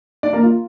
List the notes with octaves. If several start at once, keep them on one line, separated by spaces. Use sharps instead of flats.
D4 D5
A#3 A#4
F4